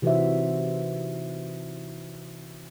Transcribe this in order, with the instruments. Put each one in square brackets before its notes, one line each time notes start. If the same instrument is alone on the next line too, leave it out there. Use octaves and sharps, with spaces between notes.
[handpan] C3 E3 D#4 F#4 C5 E5